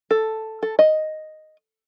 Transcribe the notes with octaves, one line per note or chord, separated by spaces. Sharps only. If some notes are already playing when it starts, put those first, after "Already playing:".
A4
A4
D#5